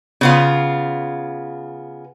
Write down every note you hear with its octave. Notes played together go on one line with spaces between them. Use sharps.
C#3 B3 F4